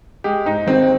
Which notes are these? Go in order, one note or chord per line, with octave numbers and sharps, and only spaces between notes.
G#3 G4
G#2 D#4
G#1 C4